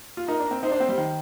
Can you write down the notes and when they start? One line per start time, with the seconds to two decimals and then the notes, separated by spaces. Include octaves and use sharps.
0.17 F4
0.28 D#4 A#4
0.40 D4
0.51 C4
0.63 D#4 C5
0.71 D4
0.80 C4
0.89 G3
0.98 D#3